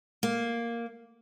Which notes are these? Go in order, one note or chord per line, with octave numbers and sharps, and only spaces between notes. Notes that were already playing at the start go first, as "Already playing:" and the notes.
A#3